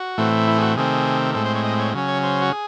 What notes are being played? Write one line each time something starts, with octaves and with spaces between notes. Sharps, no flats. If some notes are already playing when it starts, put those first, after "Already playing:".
Already playing: F#4
A2 E3 A3 C4
E4
G#4
F#4
C3 D#3 A3 C4 G#4
A2 G#3 C4 A4
C5
C#5
D#5
C#5
C#3 F#3 C#4
C#5
C5
F#4
G#4